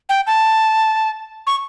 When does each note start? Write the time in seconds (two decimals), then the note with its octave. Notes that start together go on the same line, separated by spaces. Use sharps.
0.09 G5
0.27 A5
1.47 C#6